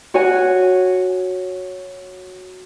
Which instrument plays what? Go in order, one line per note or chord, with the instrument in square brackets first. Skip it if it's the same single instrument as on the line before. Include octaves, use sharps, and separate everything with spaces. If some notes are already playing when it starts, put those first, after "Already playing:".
[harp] F#4 C#5 G#5